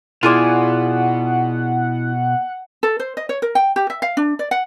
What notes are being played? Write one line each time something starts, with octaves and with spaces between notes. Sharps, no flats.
B2 E4 F4 G#4 D5 F#5
A4
C5
D#5
C#5
A#4
G5
G4
E5
F5
D4
D5
F#5